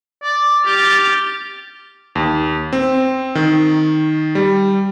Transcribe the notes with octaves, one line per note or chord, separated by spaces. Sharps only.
D5
G4 F6 A6
D#2
C4
D#3
G3